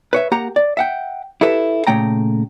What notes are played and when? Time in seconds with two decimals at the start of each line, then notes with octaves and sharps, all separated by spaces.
0.13 B4 C#5 E5
0.32 A#3 G4 F#5 A#5
0.56 D5
0.77 E5 F#5 G5
1.41 E4 G4 A4 B4 E5
1.87 A#2 C#3 A3 G5 A#5